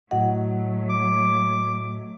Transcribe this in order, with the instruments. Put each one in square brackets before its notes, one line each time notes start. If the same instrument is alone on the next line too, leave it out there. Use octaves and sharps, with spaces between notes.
[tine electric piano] A2 F#4 D#5 [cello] F#3 A3 [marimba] F#5
[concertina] D6